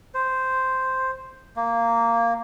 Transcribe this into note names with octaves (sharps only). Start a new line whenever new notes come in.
C5
A#3